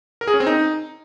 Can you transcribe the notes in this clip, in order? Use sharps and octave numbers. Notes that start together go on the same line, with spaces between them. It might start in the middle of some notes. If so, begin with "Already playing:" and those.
A#4
G#4
C#4
C4
D#4